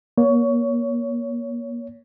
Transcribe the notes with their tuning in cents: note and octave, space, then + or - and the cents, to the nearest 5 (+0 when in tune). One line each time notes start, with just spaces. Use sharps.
A#3 +30 C#5 +20